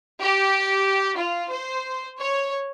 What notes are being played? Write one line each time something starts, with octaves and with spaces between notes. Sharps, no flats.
G4
F4
C5
C#5